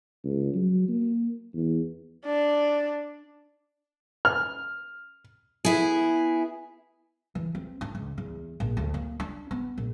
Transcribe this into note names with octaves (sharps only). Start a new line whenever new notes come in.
C#2
F#3
A#3
E2
D4
F6
B3 E4 G#4
E3
C4
D4
C#2
E2
A#1
D2
A#3
D4
B3
A#1